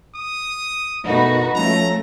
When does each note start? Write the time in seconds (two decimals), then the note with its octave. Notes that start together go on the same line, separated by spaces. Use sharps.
0.15 D#6
1.06 B2 A3 A#3 D#4 F#4 B4
1.55 F3 A3 C#4 A#5